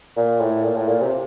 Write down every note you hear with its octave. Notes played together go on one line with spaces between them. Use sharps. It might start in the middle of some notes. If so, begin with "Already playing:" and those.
A#2
A2
A#2
A2
A#2
C3